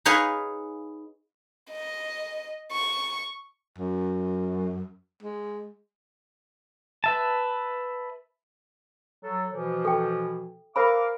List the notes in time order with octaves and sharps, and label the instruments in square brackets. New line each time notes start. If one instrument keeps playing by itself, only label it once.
[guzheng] D#4 G#4 B4 C#5 F5 G#5
[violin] D#5
C#6
[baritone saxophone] F#2
G#3
[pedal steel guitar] B4 E5 A5
[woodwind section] F#3 A4
B2 E3 F3
[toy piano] A4 G5
[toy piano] A#4 C5 B5 [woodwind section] F5 A#5 D6